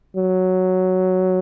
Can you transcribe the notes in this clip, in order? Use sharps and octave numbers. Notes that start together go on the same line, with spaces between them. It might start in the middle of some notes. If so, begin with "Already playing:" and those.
F#3